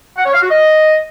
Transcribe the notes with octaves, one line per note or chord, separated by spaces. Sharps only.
F#5
C#5
F5
F#4
D#5